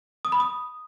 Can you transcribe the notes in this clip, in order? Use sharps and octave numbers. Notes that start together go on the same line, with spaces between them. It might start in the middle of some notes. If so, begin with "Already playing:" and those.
D#6
B5
D#6